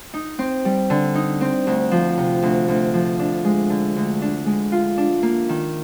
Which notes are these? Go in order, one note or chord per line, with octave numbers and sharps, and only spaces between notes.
D#4
C4
G3
D3
D#4
C4
D2
F3
C3
D2
D2
F3
D4
G#3
D3
D2
D4
G#3
F4
D4
A#3
D#3